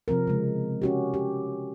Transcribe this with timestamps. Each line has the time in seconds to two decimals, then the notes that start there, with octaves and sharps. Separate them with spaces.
0.08 C3 F3 C4 A#4
0.27 C#3 G#3
0.82 C#4 F#4 G4
1.14 G4